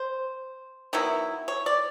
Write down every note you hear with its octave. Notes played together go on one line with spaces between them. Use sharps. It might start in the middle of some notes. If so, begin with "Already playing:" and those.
Already playing: C5
D#3 F#3 B3 E4
C#5
D5